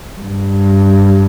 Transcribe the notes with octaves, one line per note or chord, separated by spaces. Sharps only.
G2